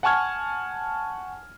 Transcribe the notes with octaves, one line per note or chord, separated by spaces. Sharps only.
F#5 G#5 A5 C#6 F6 G#6